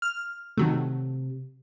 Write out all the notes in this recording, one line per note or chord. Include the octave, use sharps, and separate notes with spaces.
F6
C3 D#3 F#3 A3